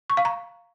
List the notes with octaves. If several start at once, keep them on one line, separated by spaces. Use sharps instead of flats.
C#6
F5
A#5